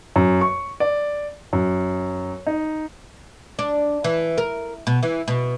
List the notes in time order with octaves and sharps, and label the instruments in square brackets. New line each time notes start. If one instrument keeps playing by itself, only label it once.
[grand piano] F#2
C#6
D5
F#2
D#4
[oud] D4
E3
A#4
B2
E3
B2